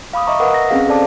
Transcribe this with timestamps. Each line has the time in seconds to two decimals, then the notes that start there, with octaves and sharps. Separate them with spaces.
0.13 F5 B5 D6 D#6
0.27 D#5 E5 A#5 C#6
0.40 A#4 B4 D#5 F#5 D#6 E6
0.54 A#6
0.70 C4 C#4 G#4 F5
0.88 A4 C5 D5 A5 D6